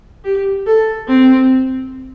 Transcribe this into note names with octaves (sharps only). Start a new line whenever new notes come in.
G4
A4
C4